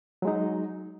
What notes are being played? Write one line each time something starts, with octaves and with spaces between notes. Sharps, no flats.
F#3 G#3 D#4